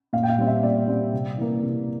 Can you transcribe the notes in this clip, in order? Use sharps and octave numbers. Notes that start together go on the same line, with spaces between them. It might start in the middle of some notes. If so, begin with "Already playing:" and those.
A#2 F5
G5
F5
G3 C4
E5
A#2 D5
G3 C4
C3
E3 A#3
C3